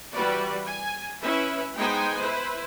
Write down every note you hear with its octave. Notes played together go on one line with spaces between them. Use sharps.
E3 G3 F#4 B4 D5
G#5
C#4 E4 B4 E5
G#3 B3 D#4 C5 G5 G#5
E4 B4 C5